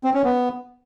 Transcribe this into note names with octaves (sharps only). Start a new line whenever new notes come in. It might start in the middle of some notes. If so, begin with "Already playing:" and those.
C4
C#4
B3